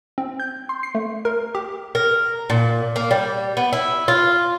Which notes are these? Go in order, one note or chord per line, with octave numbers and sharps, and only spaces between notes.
C4
G6
C6
C7
A3
A#4
G4
A#4
A#2
A#3
G3
B3
E4
F4